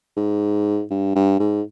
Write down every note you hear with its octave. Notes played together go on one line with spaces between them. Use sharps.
G#2
G2
G2
G#2